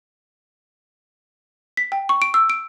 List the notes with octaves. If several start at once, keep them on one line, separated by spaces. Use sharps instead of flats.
B6
G5
C#6
D7
E6
D7